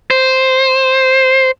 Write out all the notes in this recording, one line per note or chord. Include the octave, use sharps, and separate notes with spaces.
C5